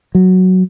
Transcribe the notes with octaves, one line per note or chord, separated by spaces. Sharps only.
F#3